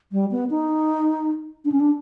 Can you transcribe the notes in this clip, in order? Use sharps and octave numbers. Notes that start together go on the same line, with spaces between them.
G3
B3
D#4
D4
C#4
D4